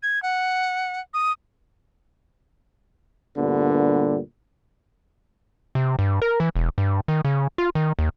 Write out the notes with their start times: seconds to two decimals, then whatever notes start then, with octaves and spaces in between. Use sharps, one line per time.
0.03 G#6
0.23 F#5
1.14 D#6
3.37 D2 G2 A#2 D3 G3 B3
5.75 C3
5.99 G2
6.22 A#4
6.40 E3
6.56 E1
6.78 G2
7.08 D#3
7.25 C#3
7.58 F4
7.75 D#3
7.99 D#2